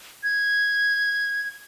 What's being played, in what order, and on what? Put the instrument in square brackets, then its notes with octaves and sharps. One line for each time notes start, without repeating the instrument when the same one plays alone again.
[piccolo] G#6